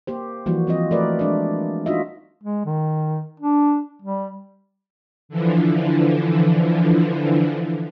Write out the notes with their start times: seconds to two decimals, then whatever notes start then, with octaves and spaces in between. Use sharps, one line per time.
0.07 A#3 G4 C5
0.46 E3 F3 G3 A#3 F#4
0.67 F3 G3 C4 F4 D#5
0.91 A3 F#4 A#4 B4 D5
1.19 G#3 D4 D5
1.86 D4 D#4 F4 F#4 D#5 E5
2.43 G#3
2.66 D#3
3.40 D4
4.02 G3
5.29 D3 E3 F3